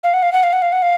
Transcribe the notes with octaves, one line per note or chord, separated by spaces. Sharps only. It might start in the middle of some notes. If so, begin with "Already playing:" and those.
F5
F#5
F5
F#5
F5
F#5
F5
F#5
F5